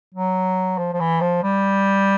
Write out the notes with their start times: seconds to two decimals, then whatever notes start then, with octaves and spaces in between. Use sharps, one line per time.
0.15 F#3
0.78 F3
0.93 F3
1.00 E3
1.21 F3
1.43 G3